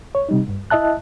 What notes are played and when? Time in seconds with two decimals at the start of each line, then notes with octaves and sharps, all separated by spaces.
0.15 C#5
0.29 C3 G3 D#4
0.48 G2
0.70 E4 D#5 E5 A5 F#6